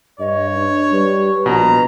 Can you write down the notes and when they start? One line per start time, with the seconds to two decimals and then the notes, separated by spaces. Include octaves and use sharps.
0.20 G2 C#5 D#5
0.55 D4
0.92 G3 B4
1.46 A#1 B2 A#5